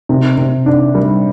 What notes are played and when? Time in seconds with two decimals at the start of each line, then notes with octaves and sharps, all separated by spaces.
0.09 C3
0.38 C3
0.66 D4
0.95 G3